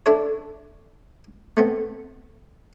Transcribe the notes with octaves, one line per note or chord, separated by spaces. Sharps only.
D4 E4 A4 C#5
A3 B3 C4